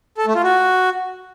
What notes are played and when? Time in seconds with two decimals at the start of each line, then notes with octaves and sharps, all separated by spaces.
0.18 A4
0.26 A3
0.35 F4
0.44 F#4